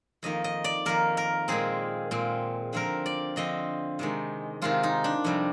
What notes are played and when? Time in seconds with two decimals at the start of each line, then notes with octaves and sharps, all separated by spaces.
0.23 F2 D#3 A#3 D#5
0.44 D#5
0.64 D5
0.85 F2 D#3 A#3 A#4
1.17 A#4
1.48 A#2 G#3 C4 G#4
2.11 A#2 G#3 C4
2.73 D3 F3 C4 A#4
3.06 D5
3.36 D3 F3 C4 D#5
3.99 C3 D#3 G#3
4.62 C3 D#3 G#3 F4
4.83 D#4
5.04 D4
5.24 F2 C3 G3